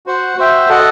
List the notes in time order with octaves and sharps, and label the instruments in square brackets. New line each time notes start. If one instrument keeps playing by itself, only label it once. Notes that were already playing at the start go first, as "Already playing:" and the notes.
[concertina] F#4 C5 F#5
F#4 C5 E5 G5
F#4 A4 D#5 F#5